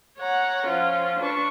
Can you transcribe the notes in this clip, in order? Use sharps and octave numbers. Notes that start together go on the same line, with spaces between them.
C#5 F#5 A#5
F3 C#4 F4
D4 B4 C#6